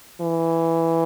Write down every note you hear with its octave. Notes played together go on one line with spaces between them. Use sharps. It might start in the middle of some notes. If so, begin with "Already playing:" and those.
E3